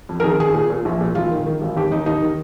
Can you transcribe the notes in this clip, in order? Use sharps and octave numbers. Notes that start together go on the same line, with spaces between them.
F2
A#4
D#3 G#4
D#3 G#4
A#2
A#2
A#1
A#2
G#1 F4
D#3
D#3
G#1
D#2 G4
D#2 D#4
D#2 D#4
D#3